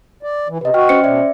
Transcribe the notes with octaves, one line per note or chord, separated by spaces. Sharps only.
D5
E3
C3 B4 D#5
F#4 G5 F6
C#4 C5 C#7
B2 D5 E5